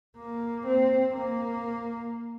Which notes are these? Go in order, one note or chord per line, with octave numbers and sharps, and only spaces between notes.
A#3
C4
A#3